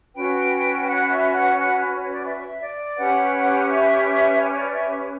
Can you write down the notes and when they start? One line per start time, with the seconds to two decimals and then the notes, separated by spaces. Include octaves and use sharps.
0.15 C#4 F#4 B4 G5
0.85 F#5
1.08 E5
1.32 F#5
1.56 F#5
1.91 C#5
2.08 D5
2.26 E5
2.61 D5
2.96 C#4 G4 B4 F#5
3.67 E5
4.37 C#5
4.55 D5
4.73 E5